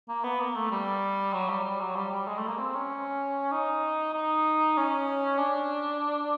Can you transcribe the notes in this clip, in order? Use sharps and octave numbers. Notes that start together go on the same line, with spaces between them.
A#3
B3
A#3
A3
G3
F#3
G3
G3
F#3
G3
G3
G#3
A3
A#3
C4
C#4
D#4
D#4
C#4
D4